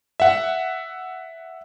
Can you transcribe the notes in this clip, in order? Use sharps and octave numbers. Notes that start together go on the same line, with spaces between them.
E5 F#5